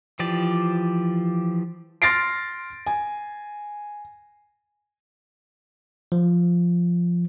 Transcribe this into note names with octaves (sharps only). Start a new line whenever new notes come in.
E3 F3 G4 D5
C6 F6 A6 A#6 C7 D7
G#5
F3